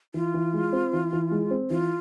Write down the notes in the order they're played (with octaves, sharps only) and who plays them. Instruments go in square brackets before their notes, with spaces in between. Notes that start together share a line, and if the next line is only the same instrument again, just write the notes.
[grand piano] E3 [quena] F4
[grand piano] E3
G#3
C4
E3
E3
G#3
C4
[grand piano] E3 [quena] F4